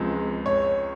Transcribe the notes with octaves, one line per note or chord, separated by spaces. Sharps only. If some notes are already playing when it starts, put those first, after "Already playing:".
Already playing: C#2 C3 F3 G#3
C#5